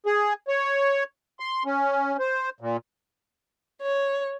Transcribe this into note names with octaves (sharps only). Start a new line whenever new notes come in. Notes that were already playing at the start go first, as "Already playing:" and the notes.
G#4
C#5
C6
C#4
C5
A#2
C#5